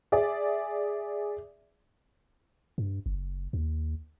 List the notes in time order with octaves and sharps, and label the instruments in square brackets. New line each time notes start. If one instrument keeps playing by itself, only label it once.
[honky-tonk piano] G#4 D5 E5
[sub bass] G2
F#1
D#2